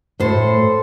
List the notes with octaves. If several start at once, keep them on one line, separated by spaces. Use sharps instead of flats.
A2 A4 C5